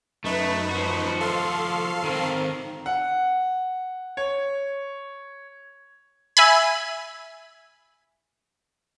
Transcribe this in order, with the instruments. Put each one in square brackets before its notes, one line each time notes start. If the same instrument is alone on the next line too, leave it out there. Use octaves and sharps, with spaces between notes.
[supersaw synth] F#2 D#4 B4 [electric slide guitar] A3
[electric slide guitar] F3 F#4
[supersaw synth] A4 F5 C6
[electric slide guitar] D#3 C4
[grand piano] F#5
C#5
[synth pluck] E5 G#5 B5